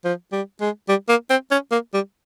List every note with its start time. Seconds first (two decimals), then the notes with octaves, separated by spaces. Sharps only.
0.04 F3
0.32 G3
0.61 G#3
0.89 G3
1.09 A#3
1.30 C4
1.51 C#4
1.71 A#3
1.94 G3